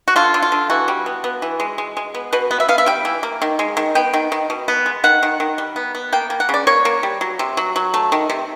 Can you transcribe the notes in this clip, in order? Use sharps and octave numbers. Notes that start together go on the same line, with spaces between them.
F#4
D3 F4
D3
F4
D3
E3 F#4
G3
B3
B3
E3
G#3
G#3
G#3
B3
B2 B4
B3
E5
B3 F5
E5
G3 G5
E3
A#3
D#3
G#3
D#3
B3 G5
D#3
D#3
B2
B3
G#3
D#3 F#5
D#3
D#3
G3
B3
B3
A#3 G5
A#3
F#5
C#3 D5
A#3 C#5
A#3
G3
F#3
C3
F#3
F#3
A3
D#3
C3